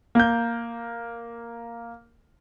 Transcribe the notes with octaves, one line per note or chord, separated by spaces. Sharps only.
A#3 G6